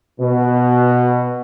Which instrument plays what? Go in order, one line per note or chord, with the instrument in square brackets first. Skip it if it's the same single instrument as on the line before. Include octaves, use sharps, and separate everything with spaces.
[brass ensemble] B2